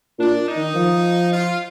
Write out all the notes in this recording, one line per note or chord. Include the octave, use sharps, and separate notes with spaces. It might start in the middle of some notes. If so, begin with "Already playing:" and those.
A#2 D4
D#4
D#3
F3
F4